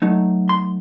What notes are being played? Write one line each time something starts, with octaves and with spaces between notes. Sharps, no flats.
F#3 A3 D#4
C6